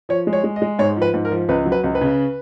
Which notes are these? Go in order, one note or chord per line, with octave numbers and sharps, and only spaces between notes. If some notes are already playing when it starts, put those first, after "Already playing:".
F3 C#5
G#3
C#5
G#3
D#5
G#3
G#2 C#5
F3 B4
G#2
A#4
F3
C#2 B4
F#3
B4
C#2
B4
C#3